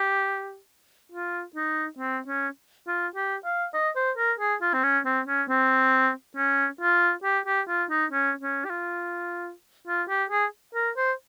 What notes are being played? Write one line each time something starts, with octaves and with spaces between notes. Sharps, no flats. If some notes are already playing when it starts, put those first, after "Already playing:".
Already playing: G4
F4
D#4
C4
C#4
F4
G4
F5
D#5
C5
A#4
G#4
F4
C4
C#4
C4
C#4
C4
C#4
F4
G4
G4
F4
D#4
C#4
C#4
G4
F4
F4
G4
G#4
A#4
C5